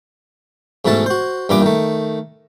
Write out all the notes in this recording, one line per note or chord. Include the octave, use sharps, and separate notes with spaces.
G#2 B2 E3 A3 A5
F#4 C5
G2 A#2 E3 B3 D6
D#3 A3